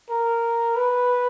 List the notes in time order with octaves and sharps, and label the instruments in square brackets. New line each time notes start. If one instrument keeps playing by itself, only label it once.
[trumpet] A#4
B4